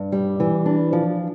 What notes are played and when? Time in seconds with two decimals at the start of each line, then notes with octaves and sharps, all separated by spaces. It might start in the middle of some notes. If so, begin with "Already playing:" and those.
Already playing: G2
0.12 G3
0.40 E3
0.66 D4
0.93 F3